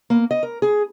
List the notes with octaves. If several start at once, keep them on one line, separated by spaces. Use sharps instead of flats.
A#3
D#5
A#4
G#4